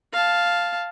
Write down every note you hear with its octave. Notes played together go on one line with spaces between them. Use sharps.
F5 A5